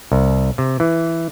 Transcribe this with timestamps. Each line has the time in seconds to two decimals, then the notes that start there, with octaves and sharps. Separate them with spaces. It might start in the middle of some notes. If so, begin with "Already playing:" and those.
0.12 C2
0.58 C3
0.80 E3